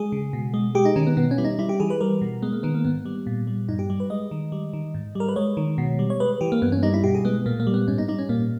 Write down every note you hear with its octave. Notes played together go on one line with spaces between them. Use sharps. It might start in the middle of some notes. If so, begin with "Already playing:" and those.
Already playing: G#3 G#4
C#3
B2
G#3
G#3 G4
D#4
D#3 C#4
B3
B2 B3
C#4
G3 E4
D#4
G3 E4
G4
E3 G#4
B4
G3 A#4
B2
G#3 B3
A#3
D#3 B3
A#3
G#2 B3
G3
A#2
G3
G2 D#4
G4
G3
B4
G#3 D#5
D#3
G3
D#3
G#2
G3 A#4
B4
G#3 C#5
D#3
B2
G3
C#5
G#3 B4
E3 G4
A#3
G2 B3
C#4
G3 D#4
E4
B2 G4
G#4
G#3 B3
A#2 A#3
A#3
G3
B3
G#2 C#4
D#4
G3 D#4
C#4
A#2 A#3